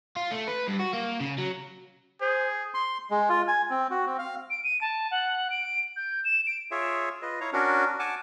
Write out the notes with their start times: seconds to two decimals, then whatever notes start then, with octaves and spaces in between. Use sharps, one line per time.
0.16 F4
0.31 A3
0.47 B4
0.68 G2
0.79 F#4
0.93 A#3
1.20 C#3
1.38 F#3
2.21 G#4 C5
2.74 C6
3.11 G#3
3.29 F4
3.48 G#5
3.70 C4
3.91 F#4
4.06 C4
4.18 F5
4.50 D7
4.64 D#7
4.81 A5
5.11 F#5
5.50 D7
5.96 G6
6.25 E7
6.47 D7
6.71 F4 G#4 C#5 E5
7.22 F4 B4 D#5
7.41 E4 C#5 F5 A#5
7.53 C#4 D4 F#4 A#4
7.99 F#5 G#5 A5 D6